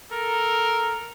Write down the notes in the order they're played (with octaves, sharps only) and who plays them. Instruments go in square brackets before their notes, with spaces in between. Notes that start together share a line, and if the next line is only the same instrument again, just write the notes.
[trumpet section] A4 A#4